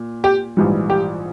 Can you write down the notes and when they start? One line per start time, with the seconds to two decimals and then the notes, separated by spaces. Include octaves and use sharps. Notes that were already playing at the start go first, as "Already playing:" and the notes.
Already playing: A#2
0.24 G4
0.57 A#1 G#2 E3 G3
0.90 G4